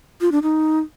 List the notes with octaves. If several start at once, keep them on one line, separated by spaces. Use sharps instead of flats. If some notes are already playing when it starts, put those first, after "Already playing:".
F4
D4
D#4